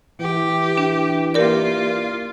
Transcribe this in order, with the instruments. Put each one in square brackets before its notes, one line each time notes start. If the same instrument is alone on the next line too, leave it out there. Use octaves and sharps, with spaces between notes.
[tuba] E3 [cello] G4
[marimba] D4
[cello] A#3 F4 [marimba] G4 A#4 D5